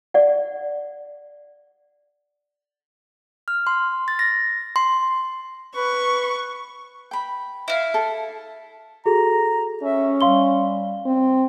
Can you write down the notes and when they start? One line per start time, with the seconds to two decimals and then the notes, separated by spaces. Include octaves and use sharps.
0.14 D5 F#5
3.48 F6
3.67 C6
4.08 A6
4.19 A#6
4.76 C6
5.76 B4 C#6
7.11 G5 B5
7.68 E4 F5
7.94 A4
9.06 F#4 G#4 A4 A#5
9.83 C#4 E5
10.21 G3 F5 C6 G7
11.06 C4